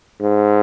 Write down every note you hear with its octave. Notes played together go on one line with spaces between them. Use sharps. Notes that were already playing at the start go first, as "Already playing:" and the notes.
G#2